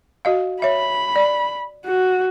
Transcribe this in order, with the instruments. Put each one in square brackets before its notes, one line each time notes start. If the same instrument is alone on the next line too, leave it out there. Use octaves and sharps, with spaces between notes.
[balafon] F#4 D#5 F5
[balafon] C#5 E5 [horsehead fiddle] B5
[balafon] D5
[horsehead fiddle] F#4